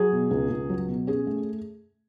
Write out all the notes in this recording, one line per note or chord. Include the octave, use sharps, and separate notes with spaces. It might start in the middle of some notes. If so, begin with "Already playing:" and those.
Already playing: F#3 G#4
B2
C#2
C#2
F#3
B2
C#4 G#4
A3